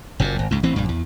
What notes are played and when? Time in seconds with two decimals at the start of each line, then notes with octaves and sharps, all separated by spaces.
0.20 F#1 F#2 A#2
0.39 G#1
0.51 C#2 G#2
0.63 A1 E3 C4
0.76 A#1 G2
0.89 E2